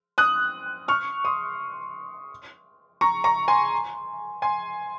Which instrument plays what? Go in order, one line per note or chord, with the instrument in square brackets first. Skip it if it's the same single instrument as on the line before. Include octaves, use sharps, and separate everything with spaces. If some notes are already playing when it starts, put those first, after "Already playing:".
[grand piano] D#6 F#6
C#6 F6
C6 D#6
A#5 C#6
A#5 C#6
G#5 C6
G#5 C6